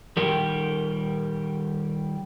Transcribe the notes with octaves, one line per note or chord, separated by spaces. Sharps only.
D#3 G3 G4 A#4